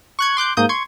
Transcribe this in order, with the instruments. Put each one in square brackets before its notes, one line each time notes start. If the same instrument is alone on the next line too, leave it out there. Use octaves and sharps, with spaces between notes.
[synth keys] C#6 F#6 G#6
C6 D6 F#6 G6
G#2 A#3 D#6 G6
C6 C#6 G#6